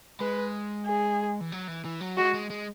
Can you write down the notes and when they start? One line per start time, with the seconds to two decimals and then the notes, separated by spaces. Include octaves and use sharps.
0.20 G#3 B4
0.85 G#4
1.41 E3
1.52 F#3
1.68 E3
1.85 E3
2.01 F#3
2.17 G#3 F#4
2.34 G#3
2.50 G#3